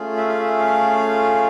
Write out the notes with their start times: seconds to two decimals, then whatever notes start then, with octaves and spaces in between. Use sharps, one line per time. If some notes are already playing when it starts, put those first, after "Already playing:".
Already playing: A3 C#4 F4 G#4
0.17 E5
0.29 F5
0.39 E5
0.58 F5